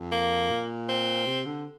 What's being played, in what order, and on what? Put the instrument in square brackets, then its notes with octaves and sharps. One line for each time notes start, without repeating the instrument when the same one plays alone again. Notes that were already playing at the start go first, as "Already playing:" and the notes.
Already playing: [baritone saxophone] F2
[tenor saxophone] A#3
[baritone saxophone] A#2
[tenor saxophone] C4
[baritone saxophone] C3
D3